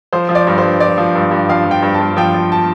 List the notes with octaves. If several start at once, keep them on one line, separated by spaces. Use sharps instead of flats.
F3 C5
F3
D5
G2
C5
G2
F3 D5
F3
G2
G2
F3 F5
F3
G5
G2
A5
G2
F3 G5
F3
A5